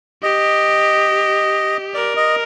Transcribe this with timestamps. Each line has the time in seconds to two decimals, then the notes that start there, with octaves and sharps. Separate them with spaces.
0.23 G4 D#5
1.94 A#4 D5
2.16 D#5